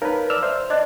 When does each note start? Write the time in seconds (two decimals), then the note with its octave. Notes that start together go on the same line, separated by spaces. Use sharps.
0.02 D#4 A#4 B4 C#5 F5
0.30 D5 E6 F6
0.43 C5 E5
0.70 D4 D#5